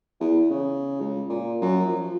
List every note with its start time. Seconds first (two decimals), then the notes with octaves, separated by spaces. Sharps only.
0.20 E2
0.50 C#3
1.01 C#2
1.29 A#2
1.62 F#2
1.86 F3